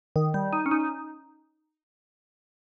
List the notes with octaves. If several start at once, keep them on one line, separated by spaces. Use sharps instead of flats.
D#3
G3
D#4
C#4
D#4